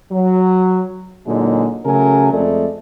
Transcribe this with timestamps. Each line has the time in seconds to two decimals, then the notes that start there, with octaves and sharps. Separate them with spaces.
0.12 F#3
1.27 A#2 D3 F#3 G#3 D#4
1.86 C#3 F#3 A3 A#4 G#5
2.33 F2 G#3 A3 D5